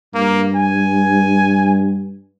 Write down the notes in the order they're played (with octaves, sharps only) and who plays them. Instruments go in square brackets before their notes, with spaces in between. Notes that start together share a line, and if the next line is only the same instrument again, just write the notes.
[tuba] G2 [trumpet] A#3
[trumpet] G#5